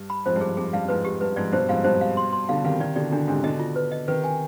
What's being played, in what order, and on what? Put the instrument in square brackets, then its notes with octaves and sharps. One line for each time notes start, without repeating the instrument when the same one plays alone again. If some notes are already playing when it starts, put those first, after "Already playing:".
Already playing: [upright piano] G2
[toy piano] B5
[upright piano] F2 G#2 [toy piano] C5
[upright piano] G2
[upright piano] F2 [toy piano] G#4
[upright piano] F2 [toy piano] G#4
[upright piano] G2 [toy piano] F5
[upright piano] F2 G#2 [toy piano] B4
[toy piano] G4
[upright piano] G2 [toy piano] B4
[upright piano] F2 G#2 [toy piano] D5
[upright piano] G2 B2 [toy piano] C5
[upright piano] F2 G#2 [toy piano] F5
[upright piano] G2 B2 [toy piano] C5
[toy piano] F5
C6
C6
[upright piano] B2 D3 [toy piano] F5
[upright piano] C3 D#3 [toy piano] F5
[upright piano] C3 D#3 [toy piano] D5
[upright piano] B2 D3 [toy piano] D5
[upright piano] B2 D3 [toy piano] D4
[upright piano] G#2 C3 [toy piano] D4
[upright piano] B2 D3 [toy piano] D#5
[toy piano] F4
B4
D#5
[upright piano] C3 D#3 [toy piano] B4
[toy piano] G#5